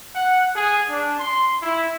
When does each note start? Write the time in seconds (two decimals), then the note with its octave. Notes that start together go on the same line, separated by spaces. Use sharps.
0.15 F#5
0.54 G#4
0.89 D4
1.20 C6
1.62 E4